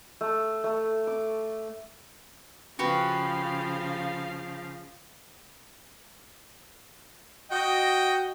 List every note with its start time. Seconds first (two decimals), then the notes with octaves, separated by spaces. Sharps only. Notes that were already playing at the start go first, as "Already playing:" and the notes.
0.21 A3
0.64 A3
1.07 D6
2.79 C#3 F3 F#4 G4 B4 F5
7.51 F#4 D#5 G5